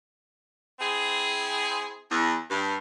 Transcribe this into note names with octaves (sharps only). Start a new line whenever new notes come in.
C4 E4 G#4
E2
G2